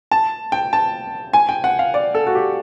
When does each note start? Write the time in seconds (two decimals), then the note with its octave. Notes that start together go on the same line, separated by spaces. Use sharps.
0.11 A5
0.52 G5
0.73 A5
1.33 G#5
1.49 G5
1.64 F#5
1.79 F5
1.94 D5
2.15 A4
2.27 F#4
2.35 G4